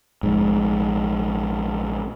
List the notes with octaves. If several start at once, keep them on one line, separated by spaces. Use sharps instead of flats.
A#1 G#2